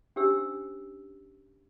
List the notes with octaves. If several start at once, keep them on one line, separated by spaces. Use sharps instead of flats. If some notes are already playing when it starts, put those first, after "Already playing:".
C#4 D4 G4 C5 E6